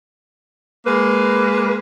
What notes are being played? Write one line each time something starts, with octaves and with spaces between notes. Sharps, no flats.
G#3 A#3 B4